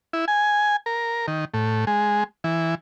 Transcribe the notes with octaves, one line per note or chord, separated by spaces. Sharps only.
E4
G#5
A#4
D#3
A2
G#3
E3